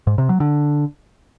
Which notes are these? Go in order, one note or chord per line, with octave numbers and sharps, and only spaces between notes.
G#2
C3
F#3
D3